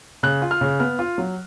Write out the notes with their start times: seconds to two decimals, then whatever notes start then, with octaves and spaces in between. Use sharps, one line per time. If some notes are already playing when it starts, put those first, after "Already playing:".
0.23 C#3 F#6
0.42 F4
0.51 F6
0.61 C#3
0.80 B3 F6
0.99 F4
1.18 F#3